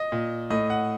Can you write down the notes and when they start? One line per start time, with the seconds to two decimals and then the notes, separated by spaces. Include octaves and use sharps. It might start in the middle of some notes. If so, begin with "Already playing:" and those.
Already playing: D#5
0.12 A#2
0.50 A2 D#5
0.70 F#5